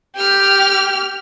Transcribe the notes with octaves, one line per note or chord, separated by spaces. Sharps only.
G4 F6